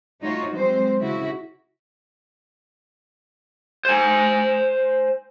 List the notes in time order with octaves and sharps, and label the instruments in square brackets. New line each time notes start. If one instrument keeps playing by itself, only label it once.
[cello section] A3 D#4 F4 F#4 C#5
F#3 G#3 C4 C5
C#3 E4 F#4
[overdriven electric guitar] C5 G#5